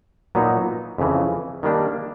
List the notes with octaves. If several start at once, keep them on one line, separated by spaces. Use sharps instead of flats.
A#2 F#3 B3 D#4
F2 C#3 E3
D#3 G3 A#3 D4